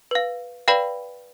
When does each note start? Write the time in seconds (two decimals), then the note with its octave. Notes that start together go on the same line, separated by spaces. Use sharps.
0.11 B4 F5
0.68 B4 D5 F5 G5 B5